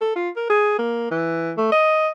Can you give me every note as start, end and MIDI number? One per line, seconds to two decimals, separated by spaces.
0.01 0.11 69
0.15 0.29 65
0.36 0.49 70
0.50 0.75 68
0.78 1.06 58
1.11 1.52 52
1.57 1.70 57
1.72 2.09 75